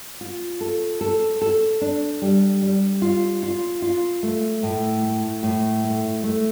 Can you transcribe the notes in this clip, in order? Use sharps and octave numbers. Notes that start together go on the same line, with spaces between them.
F4
A4
A4
A4
D4
G3
G3
F4
F4
F4
A3
A2
A3
A2
A3
A3